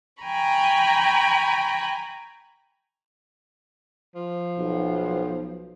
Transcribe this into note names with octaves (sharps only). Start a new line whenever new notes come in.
G5 G#5 A#5 B5 C#6
F3
B1